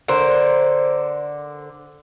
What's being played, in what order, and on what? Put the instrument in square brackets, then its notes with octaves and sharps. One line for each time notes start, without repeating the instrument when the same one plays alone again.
[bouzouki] D3 A#4 C5